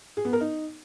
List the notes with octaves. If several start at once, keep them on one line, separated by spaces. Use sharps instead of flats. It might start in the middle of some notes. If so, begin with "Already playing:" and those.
G#4
B3
A#4
D#4